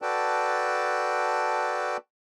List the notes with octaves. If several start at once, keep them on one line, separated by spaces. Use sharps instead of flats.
F#4 A4 B4 D5 G5 A5